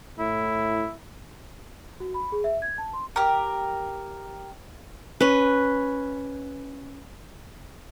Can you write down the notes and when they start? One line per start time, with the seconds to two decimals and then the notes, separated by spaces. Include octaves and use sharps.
0.19 A2 E4
2.00 F#4
2.14 B5
2.32 G#4
2.44 E5
2.62 G#6
2.78 A5
2.93 C6
3.16 G4 A#4
5.21 C#4 B4